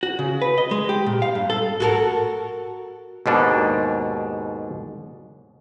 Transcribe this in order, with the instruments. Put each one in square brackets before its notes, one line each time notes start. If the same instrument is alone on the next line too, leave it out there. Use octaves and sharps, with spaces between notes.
[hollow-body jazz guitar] F#4
C#3
B4
D#5
G#3
G4
A#2
F5
G2
A4
[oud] F#4 A4 A#4
[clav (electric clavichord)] D#2 G#2 B2 D4